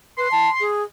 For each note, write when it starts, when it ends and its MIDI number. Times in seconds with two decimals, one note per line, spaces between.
0.18 0.28 71
0.18 0.67 84
0.31 0.49 81
0.60 0.83 68